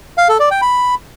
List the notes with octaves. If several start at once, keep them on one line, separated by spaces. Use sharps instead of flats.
F5
A4
D5
G5
B5